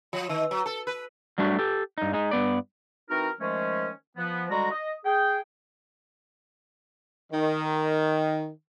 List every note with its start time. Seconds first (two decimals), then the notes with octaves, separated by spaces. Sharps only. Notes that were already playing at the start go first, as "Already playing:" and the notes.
0.13 F3
0.29 D#3
0.51 F#3
0.66 A4
0.87 B4
1.38 F#3 G3 A3 D4 F#4
1.59 G4 A4
1.98 G2 D#4
2.13 G#3 D#4
2.31 G2 B3 D5
3.09 E3 C4 D#4 F#4 A#4
3.40 D#3 F3 G#3 A3 C#4
4.17 F3 B3
4.50 D3 G3 G#3 F#4 A#5
4.71 D#5
5.05 G#4 G5
7.32 D#3